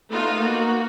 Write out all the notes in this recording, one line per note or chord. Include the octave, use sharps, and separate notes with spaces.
A3 B3 D#4 F4 F5
A#3 F#4